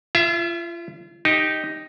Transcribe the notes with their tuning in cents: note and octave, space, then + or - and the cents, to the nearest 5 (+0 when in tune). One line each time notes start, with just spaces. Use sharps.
F4 -35 E5 +20
D#4 +0 G4 +0